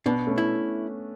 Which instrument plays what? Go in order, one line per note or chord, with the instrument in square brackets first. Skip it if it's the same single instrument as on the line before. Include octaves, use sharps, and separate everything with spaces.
[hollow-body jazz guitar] B2 [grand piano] B3 D4
[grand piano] A3 C#4
[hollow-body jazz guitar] E4